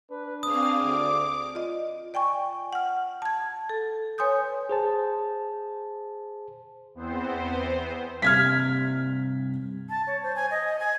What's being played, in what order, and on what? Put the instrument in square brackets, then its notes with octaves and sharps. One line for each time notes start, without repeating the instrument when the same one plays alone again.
[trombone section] D4 [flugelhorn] B4
[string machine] C4 G#4 F5 [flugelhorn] D5 [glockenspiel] D#6
[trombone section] D2 [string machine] D6
[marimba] F4 D5 D#5
D5 G5 G#5 C#6
F#5 F6
A5 G#6
A4
B4 C#5 G#5 C6 D#6 G6
[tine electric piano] G#4 C5 A5
[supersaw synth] E2 B3 C4 C5
[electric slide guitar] G2 C3 [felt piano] F6 G#6 B6
[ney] A5
C#5
C5
G#5
D#5
G#5